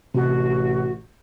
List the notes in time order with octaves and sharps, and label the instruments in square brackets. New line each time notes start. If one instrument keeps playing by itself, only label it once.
[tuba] A1 [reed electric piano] C3 [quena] F#4